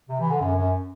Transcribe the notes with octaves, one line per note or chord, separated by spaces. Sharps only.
C3
E3
D3
F#2
F#2